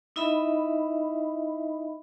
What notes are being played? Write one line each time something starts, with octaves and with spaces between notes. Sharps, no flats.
D#4 E4 D#5 E5 B5